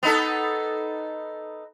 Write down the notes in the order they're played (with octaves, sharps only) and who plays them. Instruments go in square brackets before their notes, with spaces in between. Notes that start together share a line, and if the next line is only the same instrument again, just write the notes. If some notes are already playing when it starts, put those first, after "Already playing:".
[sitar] B3 D#4 A4